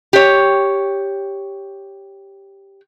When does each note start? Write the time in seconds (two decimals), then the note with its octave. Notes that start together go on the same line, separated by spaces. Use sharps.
0.13 G4 C#5